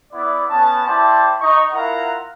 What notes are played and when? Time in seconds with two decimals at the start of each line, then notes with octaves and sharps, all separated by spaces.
0.13 B3 E4 D5
0.49 B3 C#4 A5
0.87 E4 G4 C5 D5 A5
1.41 D#4 D#5 C#6
1.72 E4 F4 A#4 F5 F#5 A#5